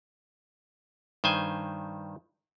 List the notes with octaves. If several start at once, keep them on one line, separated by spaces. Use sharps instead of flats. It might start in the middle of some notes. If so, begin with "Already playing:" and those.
G2 D#3 C5 G#5